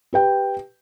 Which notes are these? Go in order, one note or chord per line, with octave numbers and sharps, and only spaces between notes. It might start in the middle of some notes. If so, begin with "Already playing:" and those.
G4 B4 G5